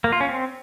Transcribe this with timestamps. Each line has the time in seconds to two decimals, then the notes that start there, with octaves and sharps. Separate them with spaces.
0.04 A#3
0.12 F4
0.21 C#4
0.29 C4